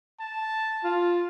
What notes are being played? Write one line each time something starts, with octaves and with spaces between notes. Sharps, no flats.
A5
F4